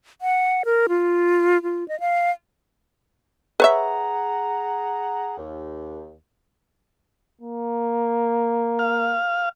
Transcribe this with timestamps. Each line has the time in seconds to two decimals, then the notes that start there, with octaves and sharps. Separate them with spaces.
0.22 F#5
0.65 A#4
0.89 F4
1.63 F4
1.88 D#5
2.00 F5
3.60 G#4 B4 C#5 E5 F#5 A#5
5.38 D#2
7.41 A#3
8.79 F5